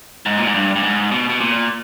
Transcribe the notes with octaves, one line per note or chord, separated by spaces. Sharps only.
G#2
A#2
G#2
G2
G2
G#2
B2
B2
A#2